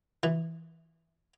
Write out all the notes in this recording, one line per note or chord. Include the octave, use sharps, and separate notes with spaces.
E3